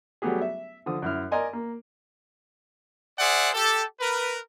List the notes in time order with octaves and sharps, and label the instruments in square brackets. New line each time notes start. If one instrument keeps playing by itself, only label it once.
[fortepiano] F#3 G3 A3 B3 G4 G#4
E5
D3 F3 D#6
F#2 E4 F6
A#4 D5 D#5 G#5 C6
A#3
[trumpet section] G#4 C5 D5 E5 F#5
G4 A4
A#4 B4